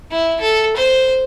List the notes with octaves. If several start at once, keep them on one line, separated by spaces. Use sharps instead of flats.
E4
A4
C5